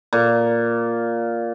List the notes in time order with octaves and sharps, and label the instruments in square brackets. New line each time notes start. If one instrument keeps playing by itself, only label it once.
[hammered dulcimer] A#2